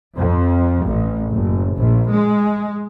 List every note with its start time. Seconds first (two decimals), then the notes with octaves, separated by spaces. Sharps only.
0.17 F2
0.85 A1
1.31 F#1
1.77 A#1
2.12 G#3